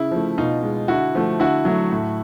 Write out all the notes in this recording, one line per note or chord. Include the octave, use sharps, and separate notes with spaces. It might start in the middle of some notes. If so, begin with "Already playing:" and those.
Already playing: C#3 E4
F3 A3
B2 D#4 F4
G#3
D3 E4 F#4
F3 A3
D3 E4 F#4
F#3 A3
A2